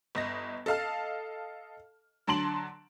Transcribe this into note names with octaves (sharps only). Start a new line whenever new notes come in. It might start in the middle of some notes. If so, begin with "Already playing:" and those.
G1 D#5 A#6
A4 D#5 F5 A5 F6
D3 F#3 A5 C6 D7 F#7